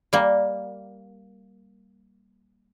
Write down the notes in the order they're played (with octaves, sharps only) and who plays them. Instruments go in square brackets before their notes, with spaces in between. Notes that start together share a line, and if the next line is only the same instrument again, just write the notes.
[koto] G3 A#3